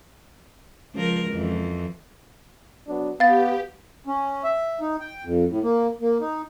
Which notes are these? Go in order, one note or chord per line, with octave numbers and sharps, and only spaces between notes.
C#2 F3 A#4
F2 E3
F#3 B3 D4
B3 G4 F5 A6
C#4
E5
D#4
G5
F2
A2
A#3
A#3
D#4